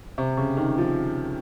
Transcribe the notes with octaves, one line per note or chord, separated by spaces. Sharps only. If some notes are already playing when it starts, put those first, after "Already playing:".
C3
C#3
D#3
F3